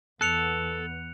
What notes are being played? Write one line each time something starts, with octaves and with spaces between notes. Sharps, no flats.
E2 B3 A4 F#6 C#7 F7